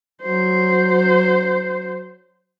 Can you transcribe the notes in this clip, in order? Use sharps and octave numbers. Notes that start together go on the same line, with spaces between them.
F#3 C5